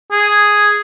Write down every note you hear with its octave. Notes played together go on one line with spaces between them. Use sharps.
G#4